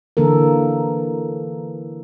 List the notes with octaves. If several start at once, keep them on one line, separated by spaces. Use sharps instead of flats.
D3 E3 A#3 A4 A#4